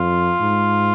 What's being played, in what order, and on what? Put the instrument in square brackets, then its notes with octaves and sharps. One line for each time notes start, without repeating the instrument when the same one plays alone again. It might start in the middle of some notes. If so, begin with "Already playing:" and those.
Already playing: [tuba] F2 [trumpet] F4
[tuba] G#2